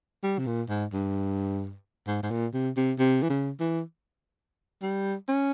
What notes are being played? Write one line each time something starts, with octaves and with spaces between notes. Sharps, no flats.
G3
C3
A#2
G#2
G2
G#2
G#2
A#2
C3
C3
C3
E3
C#3
E3
G3
C#4